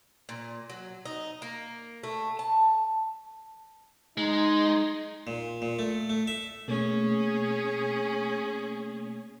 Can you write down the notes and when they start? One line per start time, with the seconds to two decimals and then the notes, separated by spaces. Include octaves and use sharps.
0.29 A#2
0.70 F#3
1.05 D#4
1.42 A#3
2.03 A3
2.39 A5
4.18 G#3 D#4
5.27 A#2
5.62 A#2
5.79 A3
6.10 A3
6.27 E5
6.68 B2 A3 A#3 C#4 G#4